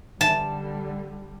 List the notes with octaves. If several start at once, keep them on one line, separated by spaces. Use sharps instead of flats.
D3 G3 A5